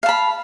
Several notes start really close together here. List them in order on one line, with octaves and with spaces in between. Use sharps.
F5 A5 B5